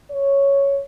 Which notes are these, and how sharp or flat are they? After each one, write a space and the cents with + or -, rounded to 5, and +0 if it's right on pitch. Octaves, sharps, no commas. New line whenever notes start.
C#5 +0